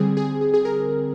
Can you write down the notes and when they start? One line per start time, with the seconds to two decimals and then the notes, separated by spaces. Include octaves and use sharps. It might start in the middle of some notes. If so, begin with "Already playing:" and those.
Already playing: D3 G3 C4 G#4
0.17 G#4
0.41 G#4
0.54 G#4
0.65 A#4